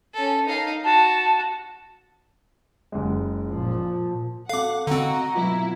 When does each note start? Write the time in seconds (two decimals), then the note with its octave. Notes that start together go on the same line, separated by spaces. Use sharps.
0.14 C#4 A4
0.46 D#4 F5
0.84 F#4 A5
2.92 F#1 G#3
3.47 A#2 F3
4.49 C4 A4 F5 F#5 D6
4.87 D3 C4 F#4 D#5 F5 A#5
5.36 B2 F#3 E4 F4